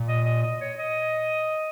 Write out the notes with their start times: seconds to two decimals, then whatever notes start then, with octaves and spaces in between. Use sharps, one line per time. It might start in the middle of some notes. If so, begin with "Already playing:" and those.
Already playing: A#2
0.08 D#5
0.26 D#5
0.43 D#5
0.60 C#5
0.78 D#5